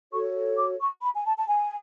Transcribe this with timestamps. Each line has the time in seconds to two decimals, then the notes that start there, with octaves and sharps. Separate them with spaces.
0.12 F#4 A4 C#5 C#6
0.57 D6
0.80 C#6
1.02 B5
1.15 G#5
1.26 A5
1.38 A5
1.48 G#5